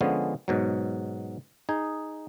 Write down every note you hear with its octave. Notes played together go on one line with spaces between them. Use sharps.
D3 F3 G#3 B3 C#4
G#2 B2 F#3
D#4 G#4